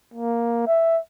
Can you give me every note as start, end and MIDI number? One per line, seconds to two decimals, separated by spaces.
0.14 0.64 58
0.67 0.99 76